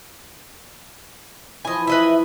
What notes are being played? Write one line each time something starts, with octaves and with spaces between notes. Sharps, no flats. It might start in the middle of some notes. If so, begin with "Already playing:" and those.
E3 F3 D#5 G#5
B4 D#5 E5